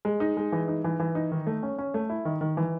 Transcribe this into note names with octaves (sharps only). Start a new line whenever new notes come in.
G#3
D#4
G#3
E3
D#4
E3
E3
D#4
D#3
A3
C#4
C#4
A3
E4
D#3
D#3
E3